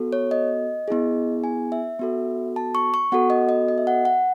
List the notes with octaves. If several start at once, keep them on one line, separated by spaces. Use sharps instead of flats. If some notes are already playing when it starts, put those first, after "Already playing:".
Already playing: B3 F#4 A4
C#5
D#5
B3 E4 G#4
G#5
E5
B3 F#4 A4
A5
C#6
C#6
B3 F#4 A4 F#5
D#5
D#5
D#5
E5
F#5
F#5